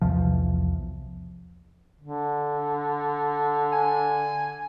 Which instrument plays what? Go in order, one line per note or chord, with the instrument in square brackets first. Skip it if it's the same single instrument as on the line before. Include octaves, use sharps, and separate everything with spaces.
[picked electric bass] B1 E2 C3 F3
[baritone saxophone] D3
[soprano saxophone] G#5